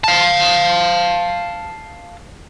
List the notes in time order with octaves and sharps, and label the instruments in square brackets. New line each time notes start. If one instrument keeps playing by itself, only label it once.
[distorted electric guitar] F5 A5